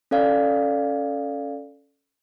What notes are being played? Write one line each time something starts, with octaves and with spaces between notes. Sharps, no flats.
C#4 A4 D5 F5